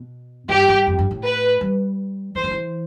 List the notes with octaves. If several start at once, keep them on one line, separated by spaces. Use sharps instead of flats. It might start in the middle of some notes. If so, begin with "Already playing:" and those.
Already playing: B2
G2 G4
G2
F2
G2
A2
B4
G3
E3 C5
F3
E3